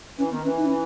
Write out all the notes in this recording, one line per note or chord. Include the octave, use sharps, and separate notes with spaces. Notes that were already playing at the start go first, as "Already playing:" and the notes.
E3 C#4
D#3 B3
E3 C#4
D#4
C#4